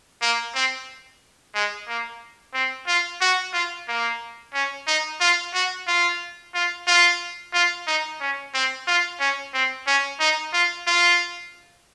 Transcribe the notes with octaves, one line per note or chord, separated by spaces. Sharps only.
A#3
C4
G#3
A#3
C4
F4
F#4
F4
A#3
C#4
D#4
F4
F#4
F4
F4
F4
F4
D#4
C#4
C4
F4
C#4
C4
C#4
D#4
F4
F4